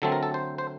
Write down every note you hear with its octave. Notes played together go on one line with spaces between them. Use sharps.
D3 F#3 A3 C4 A4
A#4
A4
C5
C5